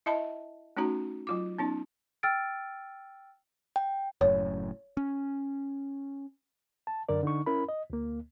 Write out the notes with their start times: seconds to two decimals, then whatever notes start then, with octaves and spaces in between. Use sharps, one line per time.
0.06 E4 D#5 E5 A5 B5
0.77 A3 C#4 D#4 F#4 A#5
1.27 F#3 F4 D6
1.59 B3 C#4 D#4
2.23 G5 E6 F6 A6 D7
3.76 G5
4.21 F#1 F#2 A2 C#5
4.97 C#4
6.87 A5
7.09 F#2 D3 A#4 D5
7.23 D3 D#4 C#6
7.46 C#4 E4 A#4 B5
7.69 D#5
7.90 D2 A#3